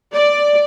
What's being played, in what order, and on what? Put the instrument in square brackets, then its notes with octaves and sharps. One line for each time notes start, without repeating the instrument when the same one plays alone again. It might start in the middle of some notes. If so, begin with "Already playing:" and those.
[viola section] D5